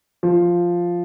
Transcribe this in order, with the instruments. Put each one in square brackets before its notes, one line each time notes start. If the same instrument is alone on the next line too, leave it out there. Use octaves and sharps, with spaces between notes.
[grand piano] F3